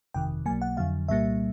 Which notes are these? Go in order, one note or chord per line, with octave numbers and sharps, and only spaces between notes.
G1 F2 C3 D#3 G5
B1 B2 F#3 A#3 G#5
F#5
F2 D3 F#3 F5
C2 A#2 G3 A#3 E5